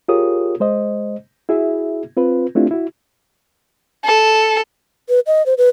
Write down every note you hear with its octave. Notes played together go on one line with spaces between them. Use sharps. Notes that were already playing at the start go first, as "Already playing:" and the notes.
F4 G4 G#4 A#4 C#5 D#6
G#3 C5 D#5
E4 F#4 G#4 E5
C4 F4 B4
A3 C4 D4 E4 F4 G4
E4 F#4
A4
B4
D#5
C5
B4